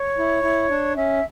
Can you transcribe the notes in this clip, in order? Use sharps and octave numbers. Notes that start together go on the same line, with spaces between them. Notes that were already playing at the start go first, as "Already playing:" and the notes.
Already playing: C#5
E4
E4
D4
C#4 E5